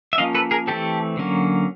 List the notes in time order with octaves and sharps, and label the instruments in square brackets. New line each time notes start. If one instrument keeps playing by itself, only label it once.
[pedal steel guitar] E5
F3 A#3 C#4 D#5 F5
A4 B4
G#4 A#4
E3 A3 C4 G4 A4
D3 F#3 A#3 C#4